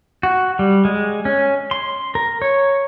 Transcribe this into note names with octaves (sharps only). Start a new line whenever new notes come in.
F#4
G3
G#3
C#4
C6
A#4
C#5